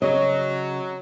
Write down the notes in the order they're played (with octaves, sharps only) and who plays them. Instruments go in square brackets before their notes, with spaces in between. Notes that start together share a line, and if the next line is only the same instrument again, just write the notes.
[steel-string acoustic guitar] C#3 [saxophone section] F#3 [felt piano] C#5 [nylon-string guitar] D#5